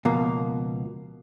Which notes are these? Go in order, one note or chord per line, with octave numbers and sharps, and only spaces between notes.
C#2 B2 F3 A#3